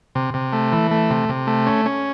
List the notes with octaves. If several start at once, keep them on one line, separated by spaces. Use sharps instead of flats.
C3
C3
A3
E3
A3
C3
C3
A3
C#4
C#4